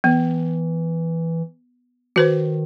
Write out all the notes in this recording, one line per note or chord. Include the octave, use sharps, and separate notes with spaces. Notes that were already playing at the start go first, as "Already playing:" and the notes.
E3 B3
D#3 F#4 B4 C5